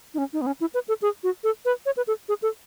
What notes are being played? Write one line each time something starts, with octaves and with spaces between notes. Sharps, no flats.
D#4
C#4
D#4
B3
C#4
E4
B4
A4
G#4
F#4
A4
B4
C#5
B4
A4
G#4
A4